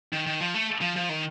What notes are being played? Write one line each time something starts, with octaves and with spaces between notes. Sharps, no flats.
D#3
D#3
F3
A3
F3
F3
D#3